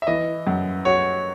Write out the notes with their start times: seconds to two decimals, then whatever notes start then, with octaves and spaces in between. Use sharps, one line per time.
0.02 E5
0.07 E3 D#5
0.47 F#2
0.85 F#4 C#5